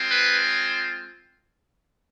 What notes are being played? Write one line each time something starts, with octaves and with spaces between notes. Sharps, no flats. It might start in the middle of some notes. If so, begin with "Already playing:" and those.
Already playing: G#3 C4 F4
B4